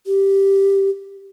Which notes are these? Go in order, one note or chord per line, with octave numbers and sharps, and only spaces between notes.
G4